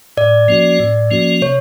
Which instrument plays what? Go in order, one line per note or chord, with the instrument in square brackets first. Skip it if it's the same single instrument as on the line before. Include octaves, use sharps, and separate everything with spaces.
[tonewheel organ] A2 [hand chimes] D5
[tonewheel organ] F3 A#3 C#4 F#4
A2
F3 A#3 C#4 F#4
[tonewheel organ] C3 [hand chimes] C#5